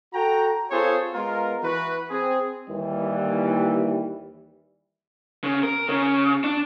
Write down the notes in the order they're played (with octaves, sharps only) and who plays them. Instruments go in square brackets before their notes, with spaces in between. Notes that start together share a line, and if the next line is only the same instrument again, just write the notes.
[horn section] F#4 A4 G5 A#5
C4 F4 G#4 A4 C5 C#5
G#3 B3 F4 A#4
E3 F#4 B4
C4 G#4
[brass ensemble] D#2 E3 G3
[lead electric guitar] C#3
A#4
C#3
D4